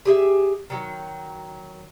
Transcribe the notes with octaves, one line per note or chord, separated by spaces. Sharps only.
G4 G#4 E5
D#3 F#3